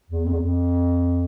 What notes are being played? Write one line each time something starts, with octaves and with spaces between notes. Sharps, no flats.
E2
F2
E2
F2